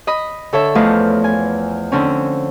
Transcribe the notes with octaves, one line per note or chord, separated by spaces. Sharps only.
D#5 B5 D#6
D3 A4 C#5 E5
E2 F3 A3 B4 D#5
G#5
D3 C4 C#4